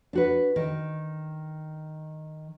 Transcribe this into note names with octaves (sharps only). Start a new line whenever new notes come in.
D4 F#4 B4
D#3